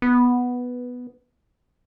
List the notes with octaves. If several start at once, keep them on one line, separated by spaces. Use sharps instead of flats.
B3